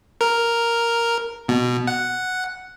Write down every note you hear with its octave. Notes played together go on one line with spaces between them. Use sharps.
A#4
B2
F#5